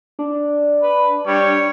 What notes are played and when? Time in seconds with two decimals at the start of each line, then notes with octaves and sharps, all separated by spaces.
0.19 D4
0.82 B4
1.26 G3 C#5